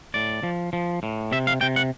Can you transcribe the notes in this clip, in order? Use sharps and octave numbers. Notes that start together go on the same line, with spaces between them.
A2 D5
F3
F3
A2
C3 E5
F5
C3 G5
F#5